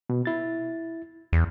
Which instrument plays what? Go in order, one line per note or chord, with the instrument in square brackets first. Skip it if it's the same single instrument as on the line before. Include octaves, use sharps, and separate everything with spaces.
[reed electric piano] B2
E4 A6
[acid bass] E2